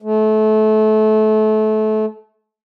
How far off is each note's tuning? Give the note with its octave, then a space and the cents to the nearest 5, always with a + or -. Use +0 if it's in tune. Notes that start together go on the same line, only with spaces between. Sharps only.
A3 -30